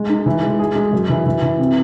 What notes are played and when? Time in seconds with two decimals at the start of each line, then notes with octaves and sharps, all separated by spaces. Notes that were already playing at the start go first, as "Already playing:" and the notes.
Already playing: G#3
0.10 D#4
0.26 E3
0.43 G#3
0.59 G#4
0.76 G#3
0.93 F#2
1.09 E3
1.26 E3
1.42 E3
1.59 C3